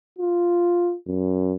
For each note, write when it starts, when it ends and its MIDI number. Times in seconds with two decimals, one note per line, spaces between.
0.18 0.95 65
1.07 1.56 42